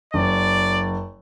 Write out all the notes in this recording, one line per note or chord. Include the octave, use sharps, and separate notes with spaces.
F#1 D5